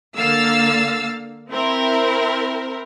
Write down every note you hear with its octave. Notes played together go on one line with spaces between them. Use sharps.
D3 A#3 F5 E6 A6
C4 E4 A#4